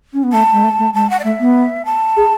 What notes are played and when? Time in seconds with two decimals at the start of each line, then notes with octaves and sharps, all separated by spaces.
0.13 C#4
0.23 B3
0.33 A3 A5
0.52 G#3
0.64 A3
0.78 A3
0.94 G#3 A5
1.10 F#5
1.19 D5
1.24 A3 E5
1.40 B3
1.85 A5
2.17 G#4